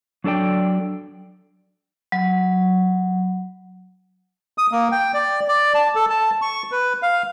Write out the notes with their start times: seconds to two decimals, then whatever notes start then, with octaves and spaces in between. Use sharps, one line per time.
0.24 F#3 D4 A4 D5 G5
2.12 F#3
4.58 D#6
4.72 A#3
4.92 G5
5.14 D5
5.48 D5
5.75 A5
5.95 A4
6.10 A5
6.42 C#6
6.72 B4
7.02 F5